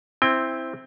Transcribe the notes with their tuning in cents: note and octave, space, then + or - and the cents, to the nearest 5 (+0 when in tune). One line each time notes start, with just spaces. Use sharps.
C4 +0 E4 +0 G5 +25